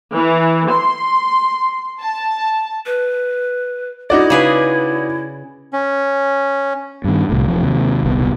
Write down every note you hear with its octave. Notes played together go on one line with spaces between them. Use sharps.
E3
C6
A5
B4
D#4 E4 F#4 D5
C#3 G#4 B4
C#4
G2 D#3
C2 A2
E1 F3
D#2 C3
D#1 C2 B2